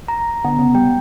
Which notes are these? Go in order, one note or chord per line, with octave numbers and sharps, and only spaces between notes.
A#5
D3 B3
C#3
G3 G5